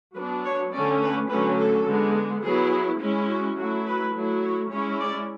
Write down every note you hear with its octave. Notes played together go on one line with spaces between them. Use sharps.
F#3 B3 D4 B4
C#5
D3 A3 C#4 D5
B4
D3 F#3 A3 C#4 B4
A4
D3 G#3 B3
F#3 B3 E4 G#4
G#3 C#4 E4
F#4
F#3 A3 E4 F#4
B4
F#3 A3 E4
C#5
G#3 C#4 E4 C#5
D5